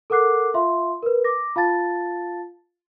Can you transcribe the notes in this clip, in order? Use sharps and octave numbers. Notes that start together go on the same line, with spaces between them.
A4 A#4 F#5 D6 F#6 C7
F4 E5 F5 C6
A#4 B4
D6 A#6
F4 F5 A5 A6